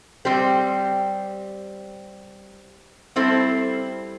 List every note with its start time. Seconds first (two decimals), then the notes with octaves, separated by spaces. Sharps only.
0.25 G3 C4 G4 C5
3.16 G3 C4 E4 A4 C5